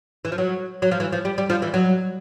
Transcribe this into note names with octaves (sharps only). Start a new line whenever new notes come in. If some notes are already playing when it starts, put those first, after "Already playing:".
E3
F3
F#3
F#3
F3
E3
F3
G3
G3
F3
E3
F#3